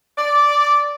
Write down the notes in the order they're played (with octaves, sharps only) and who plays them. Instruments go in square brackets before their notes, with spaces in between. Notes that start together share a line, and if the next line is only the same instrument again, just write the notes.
[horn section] D5